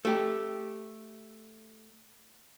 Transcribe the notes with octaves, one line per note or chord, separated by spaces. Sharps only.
A3 G4